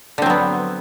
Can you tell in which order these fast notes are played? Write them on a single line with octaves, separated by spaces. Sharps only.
D3 C4 F#3 B3